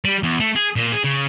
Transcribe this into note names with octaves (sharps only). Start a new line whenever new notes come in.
G3
E2
A3
G#4
A#2
G#4
C#3